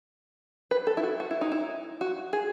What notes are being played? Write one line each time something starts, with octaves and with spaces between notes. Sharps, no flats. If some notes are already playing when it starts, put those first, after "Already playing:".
B4
A4
E4
F#4
F#4
E4
D#4
E4
F#4
G#4